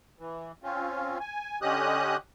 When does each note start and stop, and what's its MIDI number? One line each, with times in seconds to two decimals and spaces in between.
0.19 0.52 52
0.63 1.18 60
0.63 1.18 61
0.63 1.18 65
1.20 1.59 80
1.62 2.17 50
1.62 2.17 61
1.62 2.17 67
1.62 2.17 75
1.62 2.17 87
1.62 2.17 90